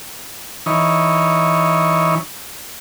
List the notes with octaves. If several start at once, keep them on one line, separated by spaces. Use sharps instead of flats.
E3 D#4 C#5